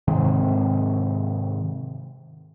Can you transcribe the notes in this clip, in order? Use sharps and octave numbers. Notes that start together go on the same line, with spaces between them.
G#2 C3 D#3 C4